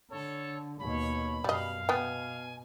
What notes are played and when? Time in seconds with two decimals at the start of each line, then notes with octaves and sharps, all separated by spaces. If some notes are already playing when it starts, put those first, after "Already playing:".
0.10 D3 A4 C#5
0.79 D#2 B2 C#5 B5
1.44 F#2 B2 G3 D#5 F5
1.89 B2 B3 G5 G#5